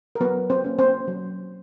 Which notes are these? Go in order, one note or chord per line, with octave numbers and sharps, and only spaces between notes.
A#4
F#3 B3 B4
C4 C5
A#3 C#4
C4 C5
F#3